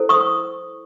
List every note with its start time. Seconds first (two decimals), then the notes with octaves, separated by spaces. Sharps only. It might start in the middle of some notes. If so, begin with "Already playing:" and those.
Already playing: E4 A4 C5
0.09 C#6 D#6